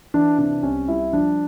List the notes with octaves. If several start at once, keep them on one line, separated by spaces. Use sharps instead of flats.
E3 D4
C3 D4
C2 C#4
G3 E4
F3 D4